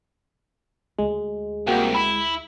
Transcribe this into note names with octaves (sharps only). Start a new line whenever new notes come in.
D2 G#3
C2 A#3 F#4 G5
E4 B5